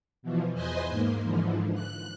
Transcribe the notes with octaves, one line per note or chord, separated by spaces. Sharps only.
B2 E3 F3
E2 B4 C5 D#5 G#5 C6
G#2 A#3
G#2 D3 E3 F3
F#6